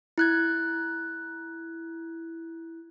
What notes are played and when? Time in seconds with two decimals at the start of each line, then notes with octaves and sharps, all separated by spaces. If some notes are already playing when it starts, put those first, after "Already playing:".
0.18 E4 F#6 G#6